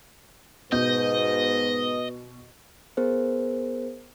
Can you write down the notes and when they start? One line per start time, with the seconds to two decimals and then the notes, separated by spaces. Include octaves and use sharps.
0.72 G#2 B2 B4 D#5 G6
2.97 B3 G#4 A#4 C5